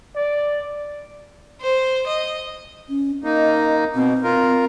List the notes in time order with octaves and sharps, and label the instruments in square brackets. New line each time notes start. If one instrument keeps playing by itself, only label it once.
[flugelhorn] D5
[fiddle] C5
D#5
[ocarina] C#4
[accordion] A#3 D#4 [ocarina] D#5
[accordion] B2 [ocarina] C4
[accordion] F4 A#4